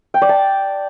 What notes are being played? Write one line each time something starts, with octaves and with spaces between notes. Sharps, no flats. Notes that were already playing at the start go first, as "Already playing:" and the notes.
G5
D5
A5